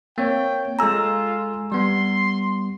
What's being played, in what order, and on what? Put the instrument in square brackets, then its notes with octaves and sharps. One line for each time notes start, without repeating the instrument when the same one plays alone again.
[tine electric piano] A#3 C4 C#5 [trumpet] G5
[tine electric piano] G#3 A4 G#5 [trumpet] F4 [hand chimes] A#5 E6
[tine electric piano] G3 B3 [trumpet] C6